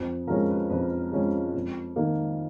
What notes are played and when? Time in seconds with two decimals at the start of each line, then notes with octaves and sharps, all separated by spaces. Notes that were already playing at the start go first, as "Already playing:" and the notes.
Already playing: F2
0.27 F3 G#3 C#4 A#4
0.49 B4
0.70 F2 B4
1.12 F3 G#3 C#4
1.55 F2
1.96 D#3 A#3